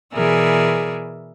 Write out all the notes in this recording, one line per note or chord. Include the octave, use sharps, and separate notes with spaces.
B2 E3 G#4 A#4 D5 E5